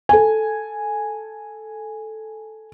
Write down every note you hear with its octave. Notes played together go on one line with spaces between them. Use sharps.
A4 G#5